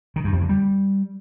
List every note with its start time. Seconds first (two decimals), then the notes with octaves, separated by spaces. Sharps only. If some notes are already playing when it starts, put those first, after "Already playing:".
0.16 D#3
0.24 G2
0.33 F2
0.41 D3
0.49 G3